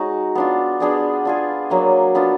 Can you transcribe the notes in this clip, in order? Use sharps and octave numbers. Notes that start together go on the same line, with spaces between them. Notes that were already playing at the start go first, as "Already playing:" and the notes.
Already playing: G#3 D#4 F#4
B3 D4 F4
B3 D4 G#4 D5
D4 F4 G#4
F#3 A#3 D4
B3 D4 F4